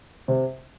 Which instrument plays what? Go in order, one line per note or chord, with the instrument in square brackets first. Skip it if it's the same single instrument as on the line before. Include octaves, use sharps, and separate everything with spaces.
[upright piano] C3